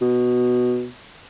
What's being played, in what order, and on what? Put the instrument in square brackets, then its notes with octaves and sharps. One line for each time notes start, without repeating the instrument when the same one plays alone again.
[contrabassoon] B2